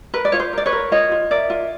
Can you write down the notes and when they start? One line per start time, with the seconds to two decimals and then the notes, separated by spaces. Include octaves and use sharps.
0.14 A#4 B4
0.25 D5
0.32 F4 C#5
0.40 C5
0.53 A#4 D5
0.66 B4 C#5
0.72 A#4
0.92 F4 C#5 D#5
1.12 F4
1.31 A#4 D5 E5
1.50 F4